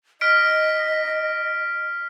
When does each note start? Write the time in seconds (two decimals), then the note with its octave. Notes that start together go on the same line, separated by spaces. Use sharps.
0.21 D#5 F6 B6 D7